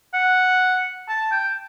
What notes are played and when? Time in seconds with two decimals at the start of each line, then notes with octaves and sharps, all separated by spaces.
0.14 F#5
1.09 A5
1.32 G5